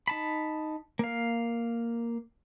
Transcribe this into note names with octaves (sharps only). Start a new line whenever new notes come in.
D#4 A5 B5
A#3 F5